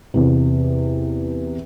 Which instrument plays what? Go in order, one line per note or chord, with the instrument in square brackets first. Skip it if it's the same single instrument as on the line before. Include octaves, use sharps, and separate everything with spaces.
[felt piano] E2 C3